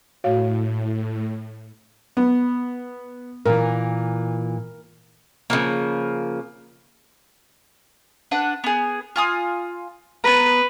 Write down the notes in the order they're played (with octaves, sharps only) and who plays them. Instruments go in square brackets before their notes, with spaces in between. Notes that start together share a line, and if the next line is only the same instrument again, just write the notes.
[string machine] A2 [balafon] F#4 C#5 F5
[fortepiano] B3
[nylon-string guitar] A#2 E3 [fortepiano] A#4
[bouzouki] C#3 F3 A#3
[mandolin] D4 B4 F#5
B3 G#4
F4 G#5 D#6
[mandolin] B3 A#5 [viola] B4